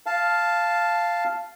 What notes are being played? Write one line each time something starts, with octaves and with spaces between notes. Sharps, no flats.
F5 A5